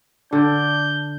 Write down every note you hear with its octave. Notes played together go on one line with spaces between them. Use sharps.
D3 D4 G6